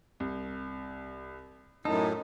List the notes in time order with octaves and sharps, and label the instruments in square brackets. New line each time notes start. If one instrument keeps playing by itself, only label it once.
[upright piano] C2
[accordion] F#2 A2 [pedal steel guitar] D#4 [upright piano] A5